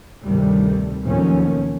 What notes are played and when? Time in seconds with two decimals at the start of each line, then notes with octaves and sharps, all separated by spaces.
0.25 D2 G2 C3 D#3 G3 A3
1.03 D#2 B2 F3 F#3 A3 C#4